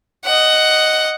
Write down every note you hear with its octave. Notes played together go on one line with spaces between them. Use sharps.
D#5 F#5